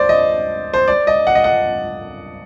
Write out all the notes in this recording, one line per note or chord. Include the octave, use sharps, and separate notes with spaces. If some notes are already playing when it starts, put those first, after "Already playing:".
Already playing: C5 D5
D#5
C5
D5
D#5
F#5
D#5
F#5